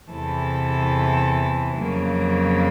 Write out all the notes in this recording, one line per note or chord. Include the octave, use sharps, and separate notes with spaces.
E2 C3 E3 A4
F2 C#3 F#3 A#3